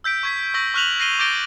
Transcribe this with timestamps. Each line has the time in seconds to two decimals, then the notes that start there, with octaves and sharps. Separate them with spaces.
0.04 E6 G6 B6 D7
0.23 C#6 G#6 B6
0.54 C#6 E6 A#6 B6 F#7
0.74 C#6 F6 F#6 B6 F7 F#7
1.00 A#6 C7 D#7 G7
1.19 D6 G6 A6 A#6 D7 G7